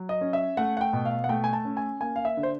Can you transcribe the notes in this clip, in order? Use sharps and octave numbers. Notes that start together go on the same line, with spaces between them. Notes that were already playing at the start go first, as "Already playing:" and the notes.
Already playing: F#3
D#5
C#4
E5
A3 F#5
F#5
G5
B2
F5
F#5
A3 G5
G#5
A5
C#4
G#5
A#3 G#5
F5
E5
D3
C5